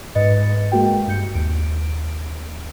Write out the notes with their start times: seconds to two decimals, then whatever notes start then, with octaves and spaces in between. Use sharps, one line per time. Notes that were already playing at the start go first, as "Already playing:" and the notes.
0.15 G#2 B4 D#5 A6 C#7
0.72 G#3 A#3 F#4 G5
1.07 G2 G6 C#7
1.34 D#2 D7